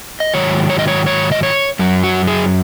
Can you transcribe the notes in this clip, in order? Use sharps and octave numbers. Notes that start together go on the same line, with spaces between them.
D#5
G#2 D#3 F#3 C#5
C#5
D#5
C#5
C#5
D#5
C#5
F#2 F#3
F#4
G#4